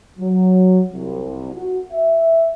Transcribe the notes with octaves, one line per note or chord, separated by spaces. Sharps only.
F#3
C2
F#4
E5